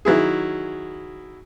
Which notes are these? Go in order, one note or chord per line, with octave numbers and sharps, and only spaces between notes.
D#3 F#3 E4 G#4